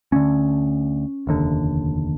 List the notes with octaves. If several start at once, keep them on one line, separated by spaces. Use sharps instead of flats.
D2 D3 C#4
F1 D#2 D3